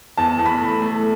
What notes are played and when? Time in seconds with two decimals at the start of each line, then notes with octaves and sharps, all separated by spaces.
0.17 E2 A5
0.39 E2
0.46 B5
0.60 A3
0.82 A3